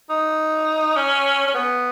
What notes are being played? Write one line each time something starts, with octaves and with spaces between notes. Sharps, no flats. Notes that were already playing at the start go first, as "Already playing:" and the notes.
D#4
C#4
C#4
B3